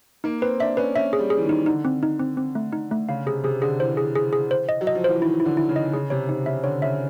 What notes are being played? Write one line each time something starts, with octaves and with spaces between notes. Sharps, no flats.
A#3 D#4
C4 B4
D4 E5
C#4 B4
C#4 E5
G#4
G3
G#4
E3
D#3
D#4
D3 D#4
C4
D#4
C4
C4
A3
D#4
A3
C#3 F5
C3 G#4
C3 G#4
D3 G#4
E3 C5
G#4
G#4
G#4
C5
D#5
F#3
D#5
F3
E3 C5
D#3 E4
E4
D3
E4
C#3
D#5
C#3 G#4
C3 C#5
C3 D#4
C#3 E5
D3 C#5
C#3 E5